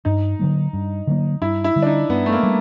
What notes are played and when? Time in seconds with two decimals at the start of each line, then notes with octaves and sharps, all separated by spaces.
0.05 G2 D#4
0.39 D3 F#3 A#3
0.73 G2
1.07 D3 F#3 A#3
1.41 G2 E4
1.64 E4
1.76 D3 G3
1.82 D4
1.87 D#4
2.09 G2 B3
2.26 A3
2.32 A#3
2.43 G3